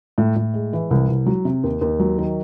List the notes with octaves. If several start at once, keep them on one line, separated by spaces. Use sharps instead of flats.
A2
A2
G#3
E3
C2
C2
F#3
C3
D#2
D#2
F#3
D#3